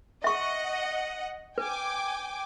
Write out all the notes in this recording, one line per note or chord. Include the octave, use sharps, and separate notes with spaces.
D#5 E5 F#5 C#6
B4 G5 G#5 D6